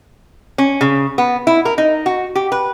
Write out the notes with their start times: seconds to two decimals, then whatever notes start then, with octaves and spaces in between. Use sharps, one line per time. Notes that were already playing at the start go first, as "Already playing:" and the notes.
0.58 C#4
0.81 C#3
1.18 B3
1.47 E4
1.65 A#4
1.78 D#4
2.06 F#4
2.35 G4
2.52 B4